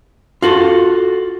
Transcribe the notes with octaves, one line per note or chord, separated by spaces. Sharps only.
F4 F#4 A4